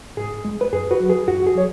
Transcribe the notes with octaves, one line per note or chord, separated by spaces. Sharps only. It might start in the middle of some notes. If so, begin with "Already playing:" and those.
G#2 G#4
G#3
B4
F#2 G#4
F#4 B4
F#3
G#4
F#2 F#4
G#4
F#3 C#5